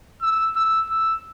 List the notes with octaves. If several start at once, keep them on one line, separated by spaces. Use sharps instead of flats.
E6
E6
E6